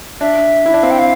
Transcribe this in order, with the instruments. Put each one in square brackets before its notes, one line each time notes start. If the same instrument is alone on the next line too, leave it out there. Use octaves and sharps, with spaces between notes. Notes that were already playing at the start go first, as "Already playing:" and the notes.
[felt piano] D4 [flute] E5
[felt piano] E4
D4
[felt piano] C4 [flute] F5
[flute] G5
F5